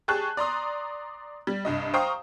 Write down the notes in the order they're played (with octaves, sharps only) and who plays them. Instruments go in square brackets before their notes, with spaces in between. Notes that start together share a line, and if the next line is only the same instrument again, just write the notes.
[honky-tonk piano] G4 G#4 A5 C#6 F#6
D5 A#5 C6 D#6
G3
C2 G2 D#5
C5 F5 G5 A#5 C#6 D#6